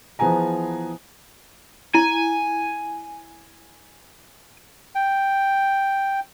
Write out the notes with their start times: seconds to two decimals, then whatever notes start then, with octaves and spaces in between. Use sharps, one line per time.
0.19 E3 F3 B3 G#4 G#5 A#5
1.94 E4 G#5
4.95 G5